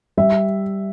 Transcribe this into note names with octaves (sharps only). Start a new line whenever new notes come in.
G3 E5